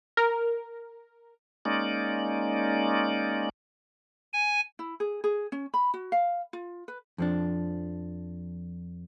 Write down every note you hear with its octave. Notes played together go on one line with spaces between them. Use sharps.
A#4
G#3 A#3 C#4 D#4 D5
G#5
E4
G#4
G#4
C#4
B5
F#4
F5
F4
B4
F2 F3 D4